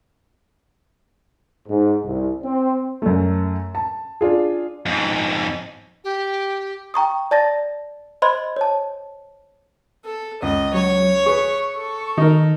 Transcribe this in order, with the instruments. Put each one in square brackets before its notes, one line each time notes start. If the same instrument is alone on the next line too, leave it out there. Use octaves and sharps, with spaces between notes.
[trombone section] G#2
C2
C4
[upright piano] F#2 A3
A5
D4 F4 G#4
[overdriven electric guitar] F2 G#2
[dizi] G4
[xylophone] G5 A#5 C#6 D#6
D5 A5 A6 A#6
C5 D#5 B5 C6 F#6 G#6
C#5 A5
[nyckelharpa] A4
[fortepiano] C#2 [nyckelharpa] D#5
[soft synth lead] F#3 [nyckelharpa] C#5
[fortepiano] G#4 B4 [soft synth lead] C#6
[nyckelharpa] A4
[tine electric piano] D#3 [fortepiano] D#4 A#4